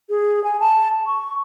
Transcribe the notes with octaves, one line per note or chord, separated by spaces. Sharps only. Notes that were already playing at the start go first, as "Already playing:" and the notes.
G#4
G#5
A5
C#6